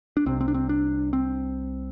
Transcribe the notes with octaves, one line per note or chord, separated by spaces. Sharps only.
D4
C2 C3 C4
C4
D4
C4
D4
C4